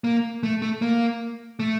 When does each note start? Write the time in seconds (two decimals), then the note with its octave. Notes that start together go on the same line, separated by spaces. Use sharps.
0.04 A#3
0.43 A3
0.62 A3
0.82 A#3
1.60 A3